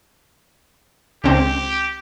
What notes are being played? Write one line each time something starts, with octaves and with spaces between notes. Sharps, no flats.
C#2 C4 G4